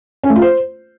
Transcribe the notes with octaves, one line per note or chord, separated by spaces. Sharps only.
C#4
A3
F4
C5